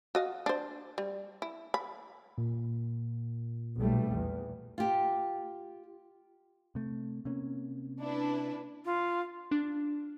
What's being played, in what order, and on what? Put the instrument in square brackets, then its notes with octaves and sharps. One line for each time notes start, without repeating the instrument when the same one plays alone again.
[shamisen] F#4 D#5 F5
D4 C5
G3
E4
B5
[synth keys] A#2
[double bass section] B1 G3 A3
E2
[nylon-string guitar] F4 G4
[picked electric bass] C3 A3
C3 A#3 C#4
[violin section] D4 E4 B4
[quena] F4
[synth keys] D4